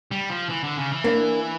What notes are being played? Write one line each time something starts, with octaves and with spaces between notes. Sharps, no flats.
G3
F3
E3
D3
C#3
E3
A#3 D4